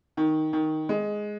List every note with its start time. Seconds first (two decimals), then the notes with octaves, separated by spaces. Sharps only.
0.17 D#3
0.53 D#3
0.89 G#3